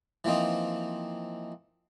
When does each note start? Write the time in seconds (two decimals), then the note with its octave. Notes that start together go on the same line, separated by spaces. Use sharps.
0.24 E3 F3 A#3 C4 D#4